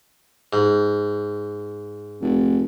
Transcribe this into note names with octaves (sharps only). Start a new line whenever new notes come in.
G#2
F1